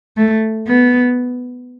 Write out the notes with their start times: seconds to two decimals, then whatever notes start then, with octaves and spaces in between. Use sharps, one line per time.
0.17 A3
0.68 B3